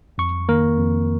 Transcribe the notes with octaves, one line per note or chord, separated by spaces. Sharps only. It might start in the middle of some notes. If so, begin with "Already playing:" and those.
F2 C#6
D#3 A#3 A#4
F2